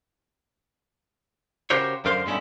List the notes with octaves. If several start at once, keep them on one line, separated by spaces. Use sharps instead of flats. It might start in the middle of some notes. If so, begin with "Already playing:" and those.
C#3 F#4 G4 A#4 C5 C#5
F#2 D3 A#4 C5 F5 C6
G2 B2 G#3 A3 C#4 E4